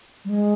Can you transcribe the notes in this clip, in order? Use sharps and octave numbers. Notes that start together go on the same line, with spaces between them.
G3
G#3